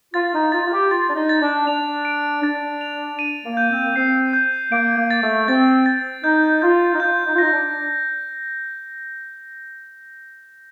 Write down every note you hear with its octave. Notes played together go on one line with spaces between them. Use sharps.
F4 A6
D#4
F4 A6
F4
G4
F4 A6
D4
D#4
A6
D4
D4 F7
D7
D4 A6
F7
D#7
A#3
G6
C4
A#3
C4 C7
G6
A#3 D7
A#3
A6
A3
C4 A6
A6
D#4 G6
F4 G6
D#4
F4 G6
D#4
F4
D#4 A#6
D4